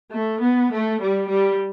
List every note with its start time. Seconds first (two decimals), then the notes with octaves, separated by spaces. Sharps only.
0.12 A3
0.42 B3
0.71 A3
1.00 G3
1.28 G3